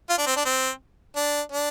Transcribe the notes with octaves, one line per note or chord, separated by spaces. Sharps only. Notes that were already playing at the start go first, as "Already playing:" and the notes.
F4
D4
C4
D4
C4
D4
D4